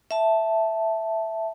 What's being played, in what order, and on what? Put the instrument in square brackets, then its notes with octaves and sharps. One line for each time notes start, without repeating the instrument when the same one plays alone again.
[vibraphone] E5 A5